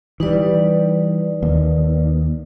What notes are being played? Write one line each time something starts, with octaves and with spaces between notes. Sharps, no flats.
E3 G3 D#4 B4 D5
D#2